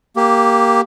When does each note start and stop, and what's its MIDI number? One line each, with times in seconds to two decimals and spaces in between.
0.16 0.81 58
0.16 0.81 67